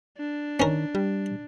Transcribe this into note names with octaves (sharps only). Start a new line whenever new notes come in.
D4
D#3 C#4 A#4
G3